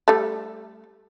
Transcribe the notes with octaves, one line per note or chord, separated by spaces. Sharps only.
G3 A3